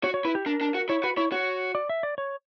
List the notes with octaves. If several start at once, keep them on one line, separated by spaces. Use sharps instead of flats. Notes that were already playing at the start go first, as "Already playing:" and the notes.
F#4 C#5
C#5
E4 B4
G4
D4 A#4
D4
F#4
E4 C#5
F#4 B4
E4 C#5
F#4 C#5
D5
E5
D5
C#5